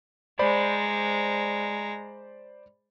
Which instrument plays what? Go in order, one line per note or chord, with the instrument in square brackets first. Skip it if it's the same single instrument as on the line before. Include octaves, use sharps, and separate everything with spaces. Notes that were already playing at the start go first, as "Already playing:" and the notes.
[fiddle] G#3 A#5 [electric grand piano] C5 D5 B5